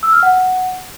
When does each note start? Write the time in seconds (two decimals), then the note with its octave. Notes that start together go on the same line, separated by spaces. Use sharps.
0.03 E6
0.13 F6
0.23 F#5